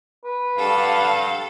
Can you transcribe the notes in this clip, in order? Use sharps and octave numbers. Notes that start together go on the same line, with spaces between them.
B4
G2 A4 F5 F#5